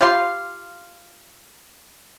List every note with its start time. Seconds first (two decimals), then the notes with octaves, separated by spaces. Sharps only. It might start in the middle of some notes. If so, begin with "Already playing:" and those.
0.01 F4 G4 F5 C6